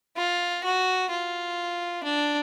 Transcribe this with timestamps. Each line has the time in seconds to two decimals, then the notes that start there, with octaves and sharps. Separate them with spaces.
0.16 F4
0.64 F#4
1.10 F4
2.04 D4